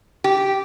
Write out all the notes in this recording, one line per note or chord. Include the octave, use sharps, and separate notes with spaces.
G4